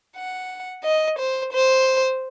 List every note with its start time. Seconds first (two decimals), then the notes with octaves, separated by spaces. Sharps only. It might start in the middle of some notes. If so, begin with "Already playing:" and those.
0.17 F#5
0.84 D#5
1.19 C5
1.53 C5